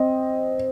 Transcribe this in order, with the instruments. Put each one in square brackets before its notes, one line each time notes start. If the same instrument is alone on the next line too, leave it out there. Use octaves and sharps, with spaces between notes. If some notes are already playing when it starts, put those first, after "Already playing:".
Already playing: [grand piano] C4 D#5